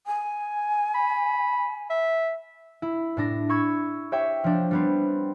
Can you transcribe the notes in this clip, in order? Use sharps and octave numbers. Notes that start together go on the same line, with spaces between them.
G#5
B5
E5
E4
A2 D4 A#6
B5 C#6 E6 G#6
G4 C#5 E5 G5
F3 D4
G3 B3 C4